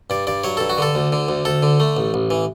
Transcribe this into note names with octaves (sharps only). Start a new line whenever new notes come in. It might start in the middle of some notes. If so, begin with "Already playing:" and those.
G2 D5
G2 D5
F#3 C#5
G2 A4
F#4
D3 A4
D2
D3
D2
D2 A4
D3
A3
A1
A1
E3